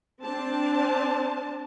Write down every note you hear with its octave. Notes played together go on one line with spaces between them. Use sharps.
C4 D4 A5